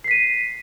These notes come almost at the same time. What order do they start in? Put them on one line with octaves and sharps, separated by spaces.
C7 B6 D#7